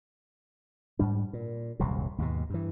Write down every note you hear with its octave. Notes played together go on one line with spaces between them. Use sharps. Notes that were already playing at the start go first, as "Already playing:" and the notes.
G#2 G3 D4
A#2
D#1 C2 F#2 C3
D#2 G#2 B2
G2 E3